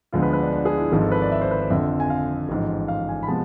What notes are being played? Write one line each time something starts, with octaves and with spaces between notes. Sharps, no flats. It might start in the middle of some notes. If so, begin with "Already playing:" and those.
D2 D3 F3 G#3 B3 F4
B4
B4
D4
D4
G#4
E4
G#1 G#2 F3
A4
B4
D5
E5
C5
B4
C5
F2 D3 F3 E5
G#5
F5
A1 G#2 F3
F5
G#5
B5
C3 F3 G#3 B3 A5